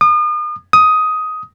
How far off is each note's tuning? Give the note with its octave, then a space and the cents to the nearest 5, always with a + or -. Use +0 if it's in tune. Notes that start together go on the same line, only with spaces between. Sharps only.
D#6 -40
D#6 +10